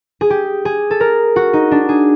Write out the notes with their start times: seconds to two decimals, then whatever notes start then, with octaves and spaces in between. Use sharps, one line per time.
0.21 G#4
0.30 G4
0.65 G#4
0.91 A4
1.00 A#4
1.36 F#4
1.53 D#4
1.71 D4
1.89 G#4